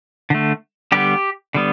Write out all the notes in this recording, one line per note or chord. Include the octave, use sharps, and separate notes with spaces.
D3 A3
D3 G3 B3 G4
D3 G3 B3